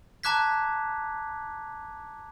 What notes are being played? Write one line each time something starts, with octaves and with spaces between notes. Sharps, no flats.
A5 A#5 D6 F#6 G#6 B6